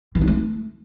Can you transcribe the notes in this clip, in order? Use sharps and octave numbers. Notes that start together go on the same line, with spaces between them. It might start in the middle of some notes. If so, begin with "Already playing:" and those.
E3
D#4
A3